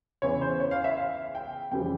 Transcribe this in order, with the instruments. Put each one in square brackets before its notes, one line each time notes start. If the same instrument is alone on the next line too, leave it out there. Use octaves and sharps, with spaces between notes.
[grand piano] E2 C#3 E3 C#5
C5
C#5
F5
E5
F5
G5
F2 C#3 E3 G3 G5